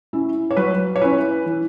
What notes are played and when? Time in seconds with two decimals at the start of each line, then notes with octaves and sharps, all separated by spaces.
0.13 C#4 E4
0.51 C#5
0.57 F#3 B4
0.96 C#5
1.02 C#4 E4 B4
1.46 E3